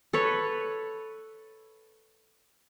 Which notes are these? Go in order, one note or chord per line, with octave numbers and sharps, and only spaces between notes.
A4 B4 C#5